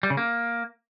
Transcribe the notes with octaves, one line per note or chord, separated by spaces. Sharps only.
G3
C#3
A#3